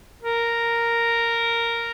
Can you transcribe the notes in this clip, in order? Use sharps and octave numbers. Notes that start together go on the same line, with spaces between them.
A#4